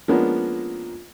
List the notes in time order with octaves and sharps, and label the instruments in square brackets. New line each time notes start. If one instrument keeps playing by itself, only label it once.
[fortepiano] F3 G#3 A#3 B3 C#4 D4